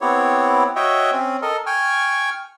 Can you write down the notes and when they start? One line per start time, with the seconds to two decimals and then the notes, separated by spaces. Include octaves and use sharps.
0.01 B3 C4 E4 G4 C#5
0.76 F#4 C#5 D#5 E5 G5
1.12 C4 C#4
1.42 A4 A#4 D#5
1.66 G5 G#5 C#6 F6